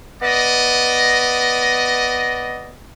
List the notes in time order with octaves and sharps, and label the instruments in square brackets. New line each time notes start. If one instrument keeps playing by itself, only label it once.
[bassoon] B3 [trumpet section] D5 D#5